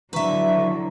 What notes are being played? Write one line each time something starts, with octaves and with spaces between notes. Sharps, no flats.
D3 F#3 E4 B4 E5 A#5 C#6